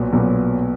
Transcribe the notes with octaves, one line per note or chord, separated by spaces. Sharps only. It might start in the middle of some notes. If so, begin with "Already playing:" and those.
Already playing: B1 A#2 F#3 B3
B1 A#2 F#3 B3